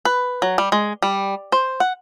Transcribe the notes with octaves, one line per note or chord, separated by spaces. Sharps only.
B4
F#3
G3
G#3
G3
C5
F#5